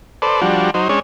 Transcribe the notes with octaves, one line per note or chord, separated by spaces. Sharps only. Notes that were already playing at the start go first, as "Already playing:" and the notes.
A4 B4 C5 D5
F3 G3 D4 F#4
F#3 D#4 C5
G#3 C#4 D4 C#5